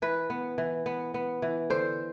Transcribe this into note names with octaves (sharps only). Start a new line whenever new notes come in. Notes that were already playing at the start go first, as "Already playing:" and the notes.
E3 B4
B3
E3
B3
B3
E3
D3 C5